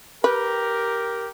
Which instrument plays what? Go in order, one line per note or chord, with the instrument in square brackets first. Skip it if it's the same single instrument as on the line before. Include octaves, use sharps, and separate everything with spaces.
[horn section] G4 A#4 [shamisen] B4